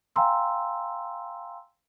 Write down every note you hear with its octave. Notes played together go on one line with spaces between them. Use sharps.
F5 G5 G#5 A#5 C6 E6